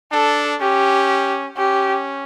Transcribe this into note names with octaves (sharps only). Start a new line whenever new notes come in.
D4 A4
C#4 G4
C#4 G4